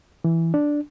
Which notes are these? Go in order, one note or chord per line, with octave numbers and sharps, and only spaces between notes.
E3
D4